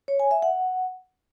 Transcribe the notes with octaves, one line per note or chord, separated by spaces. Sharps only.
C#5
G#5
E5
F#5